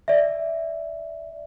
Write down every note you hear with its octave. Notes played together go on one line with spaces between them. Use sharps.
D5 E5